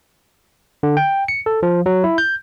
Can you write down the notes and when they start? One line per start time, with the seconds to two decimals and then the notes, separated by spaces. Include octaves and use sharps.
0.83 D3
0.97 G5
1.28 C#7
1.46 A4
1.63 F3
1.86 F#3
2.04 E4
2.18 G6